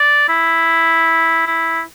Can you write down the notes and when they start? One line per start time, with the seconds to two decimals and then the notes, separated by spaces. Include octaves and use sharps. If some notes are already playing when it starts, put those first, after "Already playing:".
Already playing: D5
0.29 E4
1.47 E4